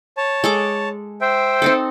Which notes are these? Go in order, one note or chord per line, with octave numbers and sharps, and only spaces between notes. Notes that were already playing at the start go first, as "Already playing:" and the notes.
C#5 A5
G#3 A4 D6
C5 E5 G5
C4 D#4 A4